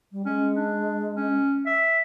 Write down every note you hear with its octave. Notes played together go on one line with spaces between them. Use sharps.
G3
G#3 C#4
D4
C#4
E5